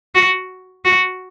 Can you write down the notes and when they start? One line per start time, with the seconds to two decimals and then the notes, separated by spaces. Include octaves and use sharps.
0.15 F#4
0.85 F#4